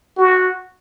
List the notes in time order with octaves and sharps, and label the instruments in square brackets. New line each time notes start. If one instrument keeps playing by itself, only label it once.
[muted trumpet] F#4